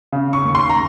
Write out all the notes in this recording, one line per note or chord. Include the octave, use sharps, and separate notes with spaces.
C#3
C#6
D#2
C6
A#5